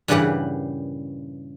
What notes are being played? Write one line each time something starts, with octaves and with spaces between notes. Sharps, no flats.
G2 A#2 C#3 E3 G4 F#5